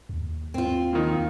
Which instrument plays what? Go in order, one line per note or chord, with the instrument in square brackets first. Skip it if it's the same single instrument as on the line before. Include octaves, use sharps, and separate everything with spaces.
[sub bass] D#2
[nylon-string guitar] C4 F4
[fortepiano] A#2 D#3 F3